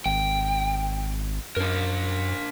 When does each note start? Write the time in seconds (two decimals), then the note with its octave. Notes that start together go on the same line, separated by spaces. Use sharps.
0.06 G#1 G5
1.57 F#2 D4 A#4